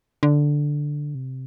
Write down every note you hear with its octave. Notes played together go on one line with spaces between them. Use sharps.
D3
C3